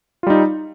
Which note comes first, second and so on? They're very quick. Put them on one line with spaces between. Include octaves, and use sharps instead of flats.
F4 G3 D#4